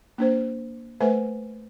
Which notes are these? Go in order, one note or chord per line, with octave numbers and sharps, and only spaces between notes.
A#3 D4 C5
A3 A4 B4 C5 E5 G#5